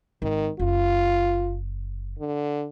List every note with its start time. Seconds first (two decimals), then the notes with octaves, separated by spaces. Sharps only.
0.22 G#1 D#3
0.59 F#1 F4
2.19 D3